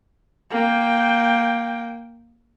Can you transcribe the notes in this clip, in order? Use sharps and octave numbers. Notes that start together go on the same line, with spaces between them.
A#3 G5